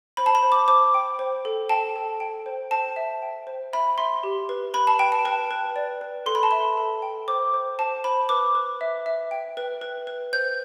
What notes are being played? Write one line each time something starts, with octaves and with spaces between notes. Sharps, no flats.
C5 B5
A5
B5
C5
D6
C5 D6
G5
C5
A4
G5 A5
A4
G5
C5
C5 A5
E5
G5
C5
E5 B5
E5 C6
G4
B4
B4 B5
A5
B4 G5
A5
B4 A5
B4
D5
B4
A4 C6
B5
A5
E5 B5
A4
G5
C5 D6
C5
C5 A5
C5 B5
B4 D6
B4
E5
E5
G5
B4
B4
B4
C5 G6